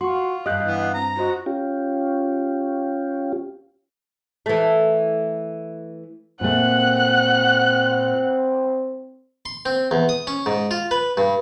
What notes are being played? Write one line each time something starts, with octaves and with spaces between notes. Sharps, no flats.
F4 F#4 C6 C#6
G2 D4 G4 D#5 F5 F#6 G6
E3 B3
C4 A#5
F4 F#4 C5 D#5
C#4 F4 G4
E3 A3
A#2 A3 C4 F#5 F#6
C6
C4
E2
D#6
C#4
G#2
F4
B4
G2